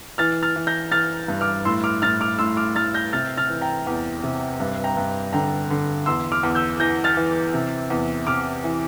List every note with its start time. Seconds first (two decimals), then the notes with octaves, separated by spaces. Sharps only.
0.18 E3 F6 A6
0.43 F6 A6
0.56 E3
0.67 G6 A#6
0.92 E3 F6 A6
1.28 G2
1.41 D6 F6
1.65 A2 C6 E6
1.84 D6 F6
2.02 A2 F6 A6
2.21 D6 F6
2.39 A2 C6 E6
2.57 D6 F6
2.76 A2 F6 A6
2.94 G6 A#6
3.13 C3 F6 A6
3.37 F6 A6
3.49 E3
3.61 G5 A#5
3.87 E2
4.23 C3
4.60 G2
4.84 G5 A#5
4.97 G2
5.33 D3 G5 A#5
5.70 D3
6.06 E2 C6 E6
6.32 D6 F6
6.43 E2
6.55 E6 G6
6.80 E3 G6 A#6
7.04 F6 A6
7.17 E3
7.54 C3
7.90 E2
8.27 C3 D6 F6
8.64 E3